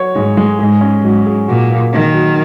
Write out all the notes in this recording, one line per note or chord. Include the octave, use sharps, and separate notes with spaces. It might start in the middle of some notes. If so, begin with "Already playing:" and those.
Already playing: F#3 F#4 C#5
G#2 G#3
G#3
G#2 G#4
C#4
G#2 F#3
G#4
A#2 F#4
A#3
D#3 F#3
F#3